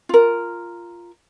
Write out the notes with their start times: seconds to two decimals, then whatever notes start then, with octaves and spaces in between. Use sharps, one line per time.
0.09 F4 A#4